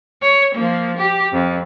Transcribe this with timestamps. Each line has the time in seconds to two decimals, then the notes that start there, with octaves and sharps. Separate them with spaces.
0.22 C#5
0.54 F3 A#3
0.97 G4
1.32 F2